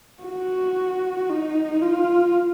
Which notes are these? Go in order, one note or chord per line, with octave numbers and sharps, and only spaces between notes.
F#4
D#4
F4